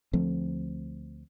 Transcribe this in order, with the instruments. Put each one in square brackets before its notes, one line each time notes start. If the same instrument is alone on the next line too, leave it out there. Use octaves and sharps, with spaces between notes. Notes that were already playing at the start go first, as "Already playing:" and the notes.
[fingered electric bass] D2 F3 A3 C4